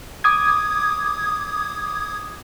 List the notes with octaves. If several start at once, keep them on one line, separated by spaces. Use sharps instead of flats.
D6 D#6 G#6